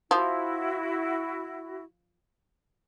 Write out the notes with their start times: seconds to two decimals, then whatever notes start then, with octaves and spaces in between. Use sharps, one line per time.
0.11 F3 E4 F#4